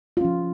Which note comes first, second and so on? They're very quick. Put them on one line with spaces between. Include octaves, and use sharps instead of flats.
F4 C#4 F3